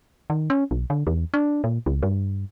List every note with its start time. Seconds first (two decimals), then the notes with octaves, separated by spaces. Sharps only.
0.30 D#3
0.50 C#4
0.71 B1
0.90 D3
1.07 E2
1.34 D4
1.64 A#2
1.86 C#2
2.03 G2